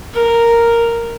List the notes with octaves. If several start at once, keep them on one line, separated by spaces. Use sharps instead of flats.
A#4